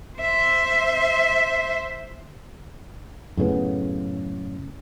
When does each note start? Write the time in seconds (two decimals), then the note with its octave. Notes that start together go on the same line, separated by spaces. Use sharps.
0.19 C5 E5
3.37 F#2 A2 C#3 B3